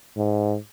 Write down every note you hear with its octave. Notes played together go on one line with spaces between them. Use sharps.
G#2